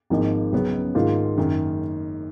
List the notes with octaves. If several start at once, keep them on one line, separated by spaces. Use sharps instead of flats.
G#1 G#2 F3 A#3 D#4
C#2 C#3 F#3 B3
G#2 D#3 A#3 F4
F#1 F#2 D#3